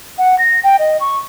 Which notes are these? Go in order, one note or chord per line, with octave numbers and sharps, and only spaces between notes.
F#5
A#6
G5
D#5
C#6